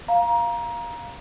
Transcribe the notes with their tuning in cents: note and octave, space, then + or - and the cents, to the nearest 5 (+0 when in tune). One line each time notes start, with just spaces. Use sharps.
F5 +0 A#5 +20